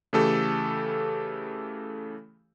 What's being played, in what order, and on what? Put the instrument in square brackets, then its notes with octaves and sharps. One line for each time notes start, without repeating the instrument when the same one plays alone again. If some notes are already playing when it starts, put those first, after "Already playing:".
[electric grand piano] C#3 E3 A3 G4 A4